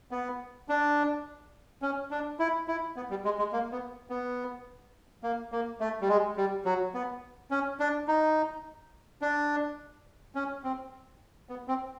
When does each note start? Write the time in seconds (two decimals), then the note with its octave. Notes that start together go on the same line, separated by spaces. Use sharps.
0.11 B3
0.69 D4
1.82 C#4
2.11 D4
2.39 E4
2.68 E4
2.96 B3
3.10 G3
3.25 G#3
3.39 G#3
3.53 A#3
3.72 B3
4.10 B3
5.23 A#3
5.52 A#3
5.80 A3
6.01 G3
6.09 G#3
6.37 G3
6.65 F#3
6.94 B3
7.51 C#4
7.80 D4
8.08 D#4
9.22 D4
10.35 C#4
10.64 C4
11.49 B3
11.68 C4